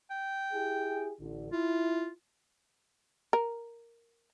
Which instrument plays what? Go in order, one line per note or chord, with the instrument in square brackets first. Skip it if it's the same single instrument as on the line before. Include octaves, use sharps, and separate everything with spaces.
[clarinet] G5
[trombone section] E4 G4 G#4
A1 D3
[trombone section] E4 [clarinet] F4
[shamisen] A#4